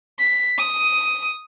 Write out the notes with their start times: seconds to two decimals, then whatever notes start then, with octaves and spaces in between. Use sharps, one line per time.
0.19 B6
0.58 D#6